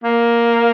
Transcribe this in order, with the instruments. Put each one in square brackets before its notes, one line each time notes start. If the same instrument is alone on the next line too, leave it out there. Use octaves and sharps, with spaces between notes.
[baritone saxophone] A#3